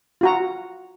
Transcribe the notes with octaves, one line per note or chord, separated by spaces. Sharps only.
F4 F#4 A#5